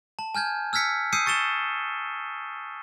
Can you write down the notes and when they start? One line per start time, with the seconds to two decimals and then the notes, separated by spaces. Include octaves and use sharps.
0.19 A5
0.35 G#5 F6 G6 G#6
0.73 E6 F6 G#6 B6 C#7
1.13 D#6 E6 G6 C7 C#7 D#7
1.26 C#6 A6 C#7 E7 G7